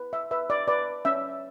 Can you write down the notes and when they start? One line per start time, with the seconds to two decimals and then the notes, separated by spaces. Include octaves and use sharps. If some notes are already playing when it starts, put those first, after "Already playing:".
Already playing: B4
0.13 E5
0.31 B4 E5
0.50 D5
0.68 B4 D5
1.05 C#4 E5